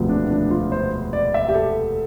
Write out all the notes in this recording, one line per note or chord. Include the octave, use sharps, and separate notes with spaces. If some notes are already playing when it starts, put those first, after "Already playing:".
Already playing: E1 D2 C3 F3 B3
D4
D4
F4
C5
D5
E5
G4
A4